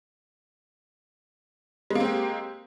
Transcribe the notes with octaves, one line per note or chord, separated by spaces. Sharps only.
G#3 A#3 C4 G4